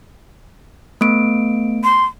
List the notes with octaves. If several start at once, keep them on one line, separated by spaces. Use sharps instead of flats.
A3 B3 D7
C6